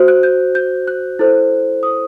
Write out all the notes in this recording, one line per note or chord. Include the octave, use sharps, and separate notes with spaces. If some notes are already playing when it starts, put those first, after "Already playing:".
Already playing: F#4 C5
F#6
G6
G6
F#6
E4 A4 C5
D#6